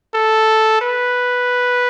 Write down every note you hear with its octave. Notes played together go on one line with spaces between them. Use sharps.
A4
B4